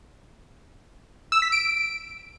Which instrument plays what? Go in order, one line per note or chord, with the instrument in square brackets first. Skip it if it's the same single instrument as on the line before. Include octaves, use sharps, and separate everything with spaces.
[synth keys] E6
B6
D7